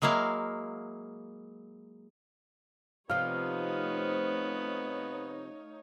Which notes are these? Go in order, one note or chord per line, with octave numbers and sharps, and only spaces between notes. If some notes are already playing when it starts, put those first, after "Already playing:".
F#3 G#3 A#3 E4 F5
C3 F3 A3 B3 D#4 C#5 F5